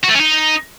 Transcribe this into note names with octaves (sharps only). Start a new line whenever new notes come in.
F#4
A3
C#4
D#4